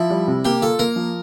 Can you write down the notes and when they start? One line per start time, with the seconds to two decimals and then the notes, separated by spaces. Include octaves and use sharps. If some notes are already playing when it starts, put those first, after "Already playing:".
Already playing: F3 E4
0.10 G3
0.28 C3
0.45 A#3 G4
0.62 F4 A4
0.79 A#3 A#4
0.96 F3